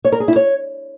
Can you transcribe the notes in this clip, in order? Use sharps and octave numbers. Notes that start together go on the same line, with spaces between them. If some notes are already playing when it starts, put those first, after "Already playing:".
C#5
A#4
G#4
E4
C#5